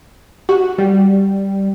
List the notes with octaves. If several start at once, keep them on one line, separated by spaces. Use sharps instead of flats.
F#4 G4
G3